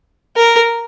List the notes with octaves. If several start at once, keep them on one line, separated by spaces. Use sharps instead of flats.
A#4